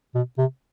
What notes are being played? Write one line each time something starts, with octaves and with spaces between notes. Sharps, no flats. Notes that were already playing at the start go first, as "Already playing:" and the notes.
B2
C3